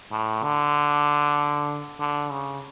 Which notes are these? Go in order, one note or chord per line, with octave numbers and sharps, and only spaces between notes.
A2
D3
D3
C#3